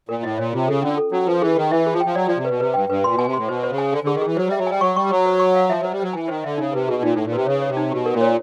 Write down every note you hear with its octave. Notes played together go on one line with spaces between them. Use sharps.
A#2 A#4
A2 D#5
A#2 C#5
C3 F4
C#3 A4
D3 C#4
A4
F#3 C#4
F3 B4
E3 G#4
D#3 G#4
E3 E5
G#4
F3
G5
F3
F#3 D5
F3 D5
C3
B2 B4
C3 B4
G2 G5
G2 B4
A#2 C6
B2 G#5
C3
A2 C6
B2 C5
C5
C#3
G#5
D3 G#5
D3 G#4
D#3
E3 G#4
F#3 C5
G3 E5
F#3
G3 G#5
F#3 C#6
G3 C#6
F#3 C#6
C5
C#6
F5
F3 E5
F#3 C5
G3
F#3 C5
E3 G#5
D#3 C5
D3 E5
C#3 D#4
C3 B4
B2 G#4
A#2 D#4
A2 D#4
A#2
C3 B4
C#3 C#5
C#5
C3
D#4
B2 G4
A#4
A#2
C#5